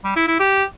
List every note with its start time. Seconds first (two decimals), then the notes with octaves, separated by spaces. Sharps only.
0.04 G3
0.16 E4
0.28 E4
0.39 G4